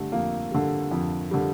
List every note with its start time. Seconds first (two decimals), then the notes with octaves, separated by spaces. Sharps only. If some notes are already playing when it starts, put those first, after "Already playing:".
Already playing: D3 G3 A3
0.12 F2 A#3
0.51 D3 G3
0.91 F2
1.31 D3 G3